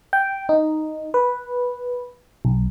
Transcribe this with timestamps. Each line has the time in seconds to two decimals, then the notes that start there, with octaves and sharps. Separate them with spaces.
0.13 G5
0.49 D#4
1.14 B4
2.45 B1